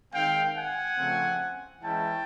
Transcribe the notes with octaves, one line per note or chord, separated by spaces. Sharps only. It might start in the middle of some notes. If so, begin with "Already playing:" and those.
D#3 G#3 C4 F5 G5
F#5 G#5
C#3 F3 A3 C4
E3 G#3 C#4 E4 G5 A5